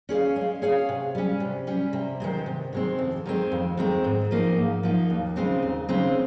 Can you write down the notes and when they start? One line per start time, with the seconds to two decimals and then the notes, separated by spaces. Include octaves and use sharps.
0.09 C#4 G#4 C#5 F5
0.36 G#3
0.62 C#4 G#4 C#5 F5
0.89 C3
1.15 G3 C#4
1.40 C3
1.67 G3 C#4
1.93 C3
2.20 D#3 G#3 C4
2.46 C3
2.73 D#3 G#3 C4
2.99 F2
3.26 D#3 G#3 C4
3.52 F2
3.77 D#3 G#3 C4
4.04 G#2
4.31 F3 A#3 D#4
4.57 G#2
4.83 F3 A#3 D#4
5.10 D#2
5.36 C#3 G#3 C4 D#4
5.63 D#2
5.89 C#3 G#3 C4 D#4